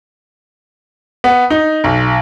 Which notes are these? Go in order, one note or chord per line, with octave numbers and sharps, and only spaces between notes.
B3
D#4
B1